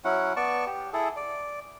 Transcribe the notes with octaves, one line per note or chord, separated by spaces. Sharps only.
F#3 C#4 E4 F#5
B3 D5 A5 C#6
G4
E4 G#4 A4
D5